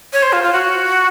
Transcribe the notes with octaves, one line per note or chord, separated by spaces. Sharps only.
C#5
C5
F4
F4
F#4